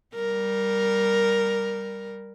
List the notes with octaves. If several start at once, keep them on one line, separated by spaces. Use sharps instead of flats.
G3 A#4